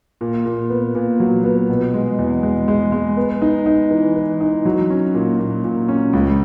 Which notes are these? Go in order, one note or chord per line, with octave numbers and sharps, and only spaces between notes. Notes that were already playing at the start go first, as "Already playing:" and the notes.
A#2
A#2
B3
A#2
F#3
B3
B2
G#3
E2
G#3
G#3
G#3
B3
D#4
D#4
E3
E3
D#4
F#3
C#4
A#2
A#2
A#2
C#4
C#2